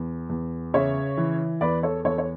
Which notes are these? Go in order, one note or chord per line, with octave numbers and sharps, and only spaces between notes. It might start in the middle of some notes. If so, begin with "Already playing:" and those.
Already playing: E2
E2
C#3 C#5 E5
E3
E2 B4 D5
A4 C#5
E2 A4 C#5
C#5